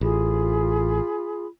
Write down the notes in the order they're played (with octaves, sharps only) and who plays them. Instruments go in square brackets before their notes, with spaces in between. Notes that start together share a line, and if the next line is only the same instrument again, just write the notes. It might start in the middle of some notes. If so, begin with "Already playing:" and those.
[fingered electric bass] A1 [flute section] F4 G#4 B5